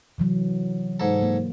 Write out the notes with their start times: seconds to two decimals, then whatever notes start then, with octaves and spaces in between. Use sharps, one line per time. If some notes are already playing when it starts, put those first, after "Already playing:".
0.18 C3 E3 F#3
1.00 G#2 A4
1.22 A#3